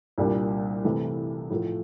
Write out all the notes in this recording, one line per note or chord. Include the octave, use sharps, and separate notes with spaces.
C2 A#2 G3 D4
C3 E3 A3
A2 F3 A3